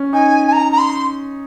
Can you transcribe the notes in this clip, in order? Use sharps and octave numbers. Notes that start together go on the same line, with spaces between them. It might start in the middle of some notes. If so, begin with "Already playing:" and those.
Already playing: C#4
D#4 G#5
G#5
A#5
A#5
C6